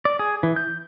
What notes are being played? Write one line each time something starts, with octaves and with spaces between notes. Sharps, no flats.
D5
G#4
E3
G6